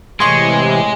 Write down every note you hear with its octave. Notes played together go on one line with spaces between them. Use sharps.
A2 C3 E3 G#3 G#4 C6 C#6